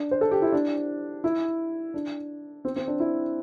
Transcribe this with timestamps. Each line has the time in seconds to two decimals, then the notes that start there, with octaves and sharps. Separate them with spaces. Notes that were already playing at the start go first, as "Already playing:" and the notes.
Already playing: D4
0.11 C5
0.21 A4
0.31 G4
0.42 E4
0.52 D4
1.24 E4
1.94 D4
2.65 C4
2.76 C4
2.87 D4
3.00 E4